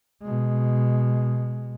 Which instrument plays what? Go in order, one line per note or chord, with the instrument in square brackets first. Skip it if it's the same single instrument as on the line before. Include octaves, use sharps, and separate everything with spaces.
[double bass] B2 G#3